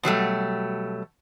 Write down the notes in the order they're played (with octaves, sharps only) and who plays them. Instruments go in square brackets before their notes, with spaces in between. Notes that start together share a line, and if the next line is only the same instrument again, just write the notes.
[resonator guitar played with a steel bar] B2 F#3 G3 A3